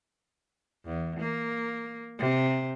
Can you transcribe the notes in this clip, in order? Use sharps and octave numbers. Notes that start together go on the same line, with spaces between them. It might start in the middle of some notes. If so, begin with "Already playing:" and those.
E2
A#3
C3